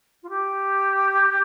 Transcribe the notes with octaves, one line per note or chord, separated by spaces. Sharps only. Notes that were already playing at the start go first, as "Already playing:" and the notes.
F4
G4